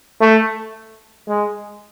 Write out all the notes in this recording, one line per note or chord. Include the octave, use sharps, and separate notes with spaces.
A3
G#3